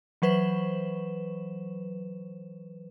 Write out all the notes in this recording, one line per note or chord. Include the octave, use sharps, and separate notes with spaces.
E3 F#3 B4 C5 E7